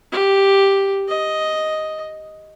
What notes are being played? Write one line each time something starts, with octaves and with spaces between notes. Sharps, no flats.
G4
D#5